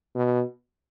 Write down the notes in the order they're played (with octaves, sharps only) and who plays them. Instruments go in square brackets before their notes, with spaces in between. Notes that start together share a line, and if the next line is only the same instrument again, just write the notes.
[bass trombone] B2